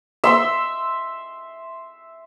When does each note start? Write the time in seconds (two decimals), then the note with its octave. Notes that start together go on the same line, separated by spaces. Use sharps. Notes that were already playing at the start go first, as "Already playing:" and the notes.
0.24 E5 C6 E6